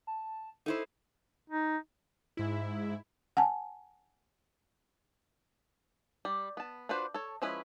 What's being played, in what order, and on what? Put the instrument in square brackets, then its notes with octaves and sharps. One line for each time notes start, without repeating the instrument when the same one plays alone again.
[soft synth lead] A5
[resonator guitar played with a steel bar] D#4 E4 C5 [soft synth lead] A4
[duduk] D#4
[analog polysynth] G#2 E4
[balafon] F#5 G#5 A5
[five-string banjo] G3
B3 A5
D4 F4 F#4 B4 C5
A4 C#5
F3 G#3 C#4 E4 B4